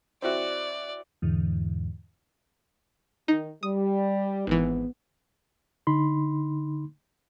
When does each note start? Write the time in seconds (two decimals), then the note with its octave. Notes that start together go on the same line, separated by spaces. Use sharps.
0.22 C4 E4 F#4 D5
1.22 E2 G#2 D3 E3
3.28 D#3 D#4
3.63 G3 D#6
4.47 G#1 E3 B3
5.87 D3 D#4 B5 C6